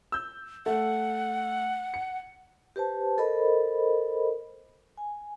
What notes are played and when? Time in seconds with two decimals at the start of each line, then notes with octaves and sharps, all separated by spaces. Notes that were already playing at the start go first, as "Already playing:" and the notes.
0.12 E6 G6
0.66 A3 F#5
1.94 C#7
2.76 G4 B4 C5 A5
3.18 A4 A#4 C5 D#5 B5
4.98 G#5